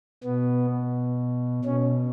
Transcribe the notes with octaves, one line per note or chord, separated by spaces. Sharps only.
B2 B3
B2 C#4